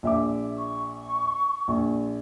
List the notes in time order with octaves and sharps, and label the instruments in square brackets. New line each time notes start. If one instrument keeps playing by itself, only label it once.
[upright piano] A#1 E5 D6
[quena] C#6
[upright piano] A#1